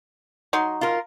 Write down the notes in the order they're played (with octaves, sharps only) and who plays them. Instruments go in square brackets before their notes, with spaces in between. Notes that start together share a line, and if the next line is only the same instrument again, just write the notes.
[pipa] F#3 D#4 C6
[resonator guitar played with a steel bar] F4 A#4